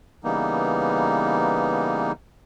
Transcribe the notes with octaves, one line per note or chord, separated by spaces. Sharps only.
C#3 E3 G3 A#3 B3 D#4